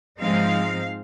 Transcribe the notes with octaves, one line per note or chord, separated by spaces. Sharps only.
G#2 F3 G#3 C4 D#4 F5